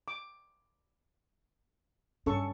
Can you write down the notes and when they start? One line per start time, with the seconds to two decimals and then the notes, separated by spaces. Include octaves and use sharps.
0.08 D6
2.26 G2 C#4 A4 C#6